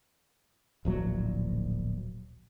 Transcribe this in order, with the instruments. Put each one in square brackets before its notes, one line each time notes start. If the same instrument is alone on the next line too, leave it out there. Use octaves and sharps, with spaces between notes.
[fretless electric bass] D1 A#1 F#3